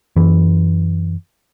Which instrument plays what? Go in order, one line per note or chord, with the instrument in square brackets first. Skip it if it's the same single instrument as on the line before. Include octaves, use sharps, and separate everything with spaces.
[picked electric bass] F#2 E3